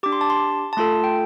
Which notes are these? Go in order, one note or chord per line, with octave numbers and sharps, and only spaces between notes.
D4 G4 D6
C6
A5
C6
A5
A3 F4 A4 C6
G5